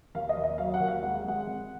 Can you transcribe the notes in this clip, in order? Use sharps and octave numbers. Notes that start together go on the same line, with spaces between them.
D#2 F5
D#5
D#2
D#5
F#3 F5
F#5
D#2
F5
G#3 F#5
G#3 F#5
G#1